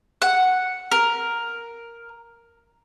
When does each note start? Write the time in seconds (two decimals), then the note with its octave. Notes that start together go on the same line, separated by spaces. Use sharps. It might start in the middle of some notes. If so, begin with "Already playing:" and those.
0.22 F#5
0.91 A#4